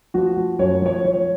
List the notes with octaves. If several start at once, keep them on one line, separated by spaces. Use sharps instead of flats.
F3 F#4
F3
F#2 C#5
F3 C#5
F3 C#5